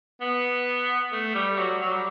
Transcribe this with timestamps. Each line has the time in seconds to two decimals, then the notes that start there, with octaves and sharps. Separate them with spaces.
0.21 B3
1.13 A3
1.35 G3
1.58 F#3
1.82 F#3
1.93 G3